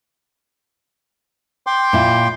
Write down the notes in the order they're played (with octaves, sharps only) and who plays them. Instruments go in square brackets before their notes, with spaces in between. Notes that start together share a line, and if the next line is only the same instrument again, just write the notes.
[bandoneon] G5 C6 D6
[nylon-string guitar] A#2 E4